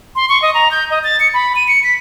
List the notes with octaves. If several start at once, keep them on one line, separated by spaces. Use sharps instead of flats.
C6
C#6
D#5
A#5
G6
D#5
A6
C#7
B5
D#7
C#7
B6